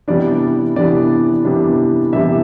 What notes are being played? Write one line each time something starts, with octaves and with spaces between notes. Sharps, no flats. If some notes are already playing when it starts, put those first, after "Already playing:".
C3 E3 G3 B3 D4 D5
C3 E3 G3 B3 D4 D5
C3 E3 G3 B3 D4
C3 E3 G3 B3 D4 E5